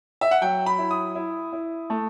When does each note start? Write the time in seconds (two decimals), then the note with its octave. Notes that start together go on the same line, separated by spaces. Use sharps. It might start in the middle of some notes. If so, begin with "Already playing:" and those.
0.21 E5
0.31 F#5
0.41 F#3 G5
0.66 B5
0.79 E4
0.91 D#6
1.15 E4
1.53 E4
1.90 A3